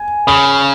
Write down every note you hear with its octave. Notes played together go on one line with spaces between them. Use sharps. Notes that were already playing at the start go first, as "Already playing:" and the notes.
Already playing: G#5
C#3 B5 D#6